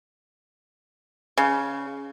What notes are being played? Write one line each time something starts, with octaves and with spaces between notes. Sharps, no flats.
C#3